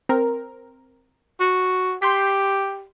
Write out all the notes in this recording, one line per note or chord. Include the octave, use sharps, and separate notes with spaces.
C4 A#4
F#4
G4 C6 G6 B6